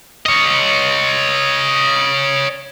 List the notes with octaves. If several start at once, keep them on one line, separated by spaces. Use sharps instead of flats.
C#5 D#5